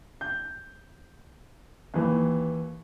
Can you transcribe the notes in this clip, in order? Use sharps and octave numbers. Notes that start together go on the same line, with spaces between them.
G6
D#2 E3